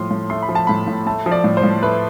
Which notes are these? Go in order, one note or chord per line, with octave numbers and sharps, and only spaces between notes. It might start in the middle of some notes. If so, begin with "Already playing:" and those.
Already playing: A2 F3 C6
A2
A3 C6
B5
F3
A5
A2 B5
A2
A3 A5
F3
D5
A2
C5
A2
A3 B4